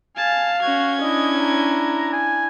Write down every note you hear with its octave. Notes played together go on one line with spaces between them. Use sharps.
F5 G#5 A5
C#4 F#4 G#6
D4 E4 D#5
A#5
G#5